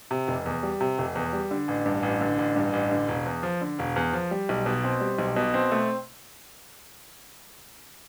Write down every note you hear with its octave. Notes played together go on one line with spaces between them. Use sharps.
C3
F1
E2
G3
C3
F1
E2
G3
D3
A1
G2
A1
D3
A1
G2
A1
D3
E1
E2
F3
D3
E1
E2
F3
G3
B1
B2
C4
G3
B1
B2
C4
A3